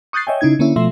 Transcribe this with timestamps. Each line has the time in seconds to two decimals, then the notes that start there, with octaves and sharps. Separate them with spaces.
0.13 C#6 D#6 F#6 G6 A6 C7
0.27 C#5 D#5 E5 G5 G#5
0.41 C#3 D#4 E4 G#6
0.59 D3 A#3 C#4 E4
0.76 B2 F3 A3 E5 C6